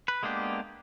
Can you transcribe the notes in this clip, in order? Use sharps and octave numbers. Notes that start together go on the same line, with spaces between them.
B4
G#3 A#3 B3 D4 G4